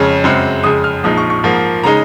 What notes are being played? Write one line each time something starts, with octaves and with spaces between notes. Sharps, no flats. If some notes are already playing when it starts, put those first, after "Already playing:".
Already playing: F2 C#3 G#3 C#4
F#2 C#3 G#3 C4
F2 C#3 G#3 D#6
F6
A#1 A#2 F3 G#3 D#4 D#6
C#6
C#6
G#2 F3 A#3
C#3 G#3 D#4 A#5